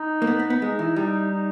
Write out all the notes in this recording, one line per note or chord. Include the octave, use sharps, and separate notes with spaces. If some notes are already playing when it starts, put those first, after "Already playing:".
Already playing: D#4
A#3
B3
B3
B3
G#3 D#4
E3
G3 D#4
D#4